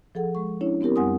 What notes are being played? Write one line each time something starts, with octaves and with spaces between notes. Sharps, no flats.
F3 G#4 A4 F#5
G#3 C#6
C#4 D4 E4 C#5
B3 C4 E4 G4 A#4
F#2 G3 F#5 G#5 C6 D#6